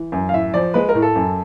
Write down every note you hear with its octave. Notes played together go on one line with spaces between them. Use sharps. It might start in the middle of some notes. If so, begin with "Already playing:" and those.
Already playing: E3
F#2
F5
A2 E5
F3 D5
G#3 B4
A#4
A2
A4
F#2